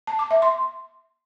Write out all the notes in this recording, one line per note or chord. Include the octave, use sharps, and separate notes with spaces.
A5
D6
E5
C6